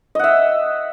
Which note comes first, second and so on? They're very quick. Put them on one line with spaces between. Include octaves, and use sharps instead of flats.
D#5 F#5 E5